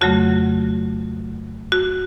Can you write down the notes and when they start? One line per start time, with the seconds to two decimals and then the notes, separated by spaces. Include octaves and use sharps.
0.01 F2 C#3 F#3 A3 F#4
1.72 F#4